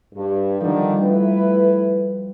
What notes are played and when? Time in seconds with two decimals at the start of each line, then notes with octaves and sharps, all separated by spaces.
0.14 G2
0.61 D3 D#3 F3 G3 D4
1.02 A3 E4 B4